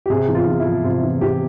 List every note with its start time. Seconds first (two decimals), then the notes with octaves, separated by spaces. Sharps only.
0.06 G4
0.10 C3 G#4
0.29 E2
0.35 F4
0.47 E2
0.60 E4
0.66 F3
0.84 C3 F4
1.03 E2
1.21 E2 G4